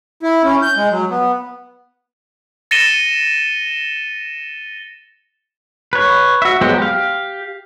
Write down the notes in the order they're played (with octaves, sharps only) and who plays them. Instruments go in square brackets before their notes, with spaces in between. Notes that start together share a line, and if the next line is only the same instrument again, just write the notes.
[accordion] E4
C#4
G6
G#3
F#3
B3
[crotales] A6 A#6 C#7 D#7 E7 G7
[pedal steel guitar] B4 C#5
F#4 E5
F#3 G#3 B3 G4 C5
G4 F5